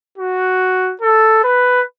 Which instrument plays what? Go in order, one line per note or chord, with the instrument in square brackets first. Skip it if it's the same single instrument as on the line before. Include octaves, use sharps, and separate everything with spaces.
[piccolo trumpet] F#4
A4
B4